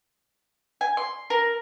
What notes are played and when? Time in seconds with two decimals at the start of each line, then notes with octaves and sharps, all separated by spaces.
0.81 G#5
0.97 C6
1.30 A#4